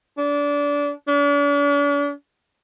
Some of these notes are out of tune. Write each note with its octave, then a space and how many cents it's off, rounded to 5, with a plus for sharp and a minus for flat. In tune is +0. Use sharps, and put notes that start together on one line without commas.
D4 -25
D4 -45